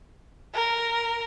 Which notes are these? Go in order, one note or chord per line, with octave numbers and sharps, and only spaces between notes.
A#4